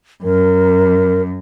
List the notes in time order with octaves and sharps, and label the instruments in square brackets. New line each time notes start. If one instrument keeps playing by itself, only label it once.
[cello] F#2 [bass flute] A#4